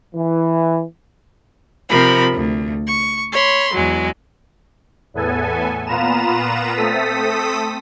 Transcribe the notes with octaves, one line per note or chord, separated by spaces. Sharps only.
E3
C3 F3 A#4 B5
D2
C#6
C#5 B5 C6
E2 F#3 G#3
E2 A2 B3 A4 G#5
A#2 B3 F4 B4 A#5 E7
A3 C4 A4 D#6 B6